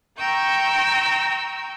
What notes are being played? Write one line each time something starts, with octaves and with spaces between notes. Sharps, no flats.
G5 A#5 C#6 E6 G6